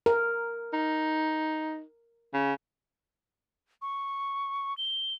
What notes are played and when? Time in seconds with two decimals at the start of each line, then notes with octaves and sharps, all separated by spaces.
0.06 A#4
0.73 D#4
2.33 C#3
3.82 C#6
4.78 G7